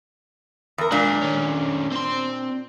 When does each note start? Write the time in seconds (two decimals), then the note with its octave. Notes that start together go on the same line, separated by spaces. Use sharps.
0.78 E2 A#4
0.92 A#2 G#3 A#3 D4
1.21 D#3 C#4
1.92 C4 C6